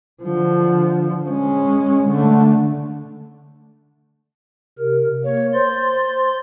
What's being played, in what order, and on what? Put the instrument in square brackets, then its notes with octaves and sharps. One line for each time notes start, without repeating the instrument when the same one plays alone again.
[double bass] D3 F3
G#3 C#4
D3 A3
[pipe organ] C3 A#4
[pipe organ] A#3 [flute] C#5
[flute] C5 [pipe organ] C6 A6